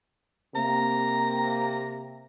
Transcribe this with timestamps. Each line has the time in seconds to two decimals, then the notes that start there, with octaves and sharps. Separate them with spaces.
0.56 C3 A#3 A#5